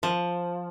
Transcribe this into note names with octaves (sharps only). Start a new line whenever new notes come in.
F3